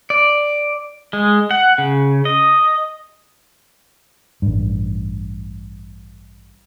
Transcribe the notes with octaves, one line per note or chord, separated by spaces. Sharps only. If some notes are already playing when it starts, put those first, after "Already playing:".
D5
G#3
F#5
C#3
D#5
A1 G2